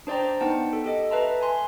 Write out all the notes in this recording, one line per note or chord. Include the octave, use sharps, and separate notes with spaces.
D4 C5 D5 G5 A#5
B3 D#4 F#5 G5 A5
A4
G4 A4 D#5
B4 E5 A5 A#5 C6
G#5 C6